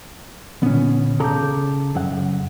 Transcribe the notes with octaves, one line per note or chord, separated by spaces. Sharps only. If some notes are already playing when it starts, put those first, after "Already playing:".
A#2 D3 D#3 B3 C#4
C#3 A4 A5 A#5 D6 G6
F#2 C#3 F#5